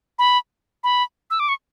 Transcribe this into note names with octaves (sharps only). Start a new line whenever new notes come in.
B5
B5
E6
D6
C#6